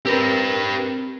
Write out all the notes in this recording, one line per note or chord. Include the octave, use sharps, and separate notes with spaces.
C4 G4 A#4 B4 A#6